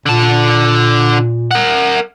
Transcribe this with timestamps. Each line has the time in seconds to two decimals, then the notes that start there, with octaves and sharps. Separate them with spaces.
0.06 A#2 D3 A5
1.51 A#4 F#5